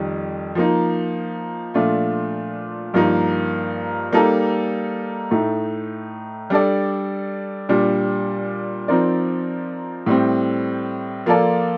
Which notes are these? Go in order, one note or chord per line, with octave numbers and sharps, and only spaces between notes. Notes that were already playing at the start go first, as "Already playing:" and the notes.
Already playing: F2 D#3 G3
F3 A#3 D#4
A#2 F3 A3 D4 F4
G2 F3 A#3 D#4 A#4
G3 A#3 D#4 A4
A2 A3 D#4
G3 D4 A4 D5
A#2 G3 D4
F3 C4 D#4 A#4 D5
A2 G3 C4
F3 A#3 F4 A4 D5